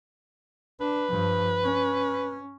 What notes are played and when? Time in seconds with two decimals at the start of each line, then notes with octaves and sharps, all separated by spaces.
0.81 D4 B4
1.10 G2 F3
1.64 C#4